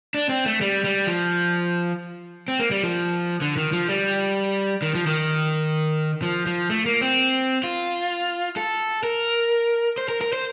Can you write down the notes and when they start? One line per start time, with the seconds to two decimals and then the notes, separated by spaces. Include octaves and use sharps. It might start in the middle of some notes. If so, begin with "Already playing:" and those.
0.14 D4
0.29 C4
0.46 A3
0.61 G3
0.84 G3
1.07 F3
2.48 C4
2.60 A#3
2.71 G3
2.83 F3
3.41 D3
3.57 D#3
3.72 F3
3.89 G3
4.82 D#3
4.95 F3
5.06 D#3
6.22 F3
6.46 F3
6.70 A3
6.86 A#3
7.01 C4
7.64 F4
8.57 A4
9.03 A#4
9.98 C5
10.09 A#4
10.21 A#4
10.33 C5